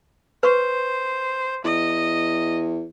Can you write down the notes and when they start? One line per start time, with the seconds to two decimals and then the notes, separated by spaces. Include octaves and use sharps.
0.43 B4 C5 C#6
1.65 E2 D#5